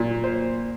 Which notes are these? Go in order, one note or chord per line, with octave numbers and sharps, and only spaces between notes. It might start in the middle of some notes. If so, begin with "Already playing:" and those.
Already playing: A#2
C5